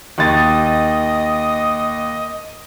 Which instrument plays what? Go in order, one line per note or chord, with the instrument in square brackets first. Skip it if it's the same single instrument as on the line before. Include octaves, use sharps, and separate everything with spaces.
[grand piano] D#2 A6 [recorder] D#5